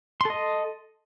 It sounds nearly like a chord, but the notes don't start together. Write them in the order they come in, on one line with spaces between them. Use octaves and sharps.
C6 A4 D#5